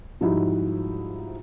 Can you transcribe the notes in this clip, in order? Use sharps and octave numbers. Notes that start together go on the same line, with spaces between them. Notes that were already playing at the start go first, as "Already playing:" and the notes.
G#2 F3 G3 D#4 E4 F#4